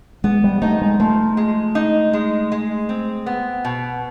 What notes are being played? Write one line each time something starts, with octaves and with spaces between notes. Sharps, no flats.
G#3 B3
G3
A3 D#4
G#3
F3 A3
G#3
D#4
G#3
G#3
C4
B3
B2